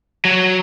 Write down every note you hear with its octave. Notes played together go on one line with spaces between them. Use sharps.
F#3